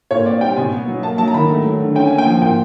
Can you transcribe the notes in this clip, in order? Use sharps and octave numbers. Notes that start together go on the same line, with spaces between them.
A#2 C#5
C4 D5
G3 G5
B2 G#5
B3
F#3
A#3 A5
F#3 A5
A#5
D#3 B5
A3
F#3
D3
C#4 G5
A#3 G#5
G5
F3
A#2 G5